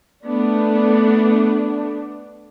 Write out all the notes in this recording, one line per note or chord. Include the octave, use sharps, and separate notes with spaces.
A3 B3 D4